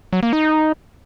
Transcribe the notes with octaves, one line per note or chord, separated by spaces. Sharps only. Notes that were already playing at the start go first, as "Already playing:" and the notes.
F#3
A#3
D#4